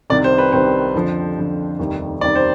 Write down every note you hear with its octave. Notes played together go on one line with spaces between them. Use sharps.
C2 C3 D#3 G3 D5
C5
B4
C2 C3 D#3 G3 C5
F2 D3 F3
F2 D3 F3
F1 D#2 D#3 G3
F1 D#2 D#3 G3 D5
C5